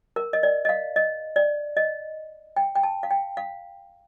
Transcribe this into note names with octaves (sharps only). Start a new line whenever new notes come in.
A#4
D#5
D5
D#5
F5
D#5
D5
D#5
G5
G5
A5
F5
G5
F5